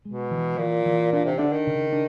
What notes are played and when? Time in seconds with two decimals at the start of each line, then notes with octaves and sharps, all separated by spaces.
0.05 B2 G#3
0.31 E3
0.58 A#2 E3
0.86 E3
1.12 A#2 D4
1.25 C3
1.39 D3 D4
1.53 D#3
1.67 C#3
1.92 D4